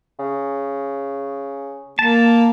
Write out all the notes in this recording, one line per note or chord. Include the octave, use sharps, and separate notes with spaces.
C#3
A#3 A5